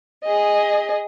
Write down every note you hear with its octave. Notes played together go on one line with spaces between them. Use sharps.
G#4 D#5